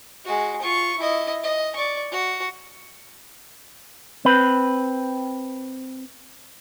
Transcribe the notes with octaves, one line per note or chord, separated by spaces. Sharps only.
G#3 F#4
F4 C#6
E4 D#5
D#5
D5 C#6
F#4
C4 B4